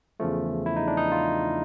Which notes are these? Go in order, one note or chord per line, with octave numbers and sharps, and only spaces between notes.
E2 C#3 F3 A3
E4
D#4
D4
D#4
F4